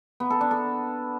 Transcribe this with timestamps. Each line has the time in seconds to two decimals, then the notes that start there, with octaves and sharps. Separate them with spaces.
0.20 B3
0.30 A4
0.41 D4
0.51 A4